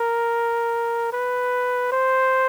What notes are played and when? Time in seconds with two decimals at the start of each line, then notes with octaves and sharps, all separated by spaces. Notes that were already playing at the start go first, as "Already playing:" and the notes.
Already playing: A#4
1.13 B4
1.92 C5